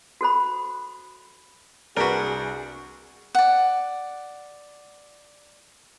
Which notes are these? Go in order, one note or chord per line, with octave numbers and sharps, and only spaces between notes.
F#4 A4 C5 B5
C2 D4 F#4 G#4 A#4 B4 D7
D5 F#5